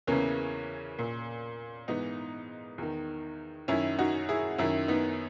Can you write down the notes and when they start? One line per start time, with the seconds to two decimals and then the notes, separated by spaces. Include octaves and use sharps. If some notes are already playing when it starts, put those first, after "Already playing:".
0.07 E2 C#3 E3 A#3 C#4
0.99 A#2
1.88 G#2 E3 B3 D#4
2.78 E2 D#3
3.68 F#2 D#3 C#4 E4
3.99 D#4 F#4
4.29 E4 G#4
4.58 F#2 D#3 C#4 E4
4.88 B3 D#4